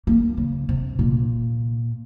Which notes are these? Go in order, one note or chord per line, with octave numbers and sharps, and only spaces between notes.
A#3
C#3
C3
A#2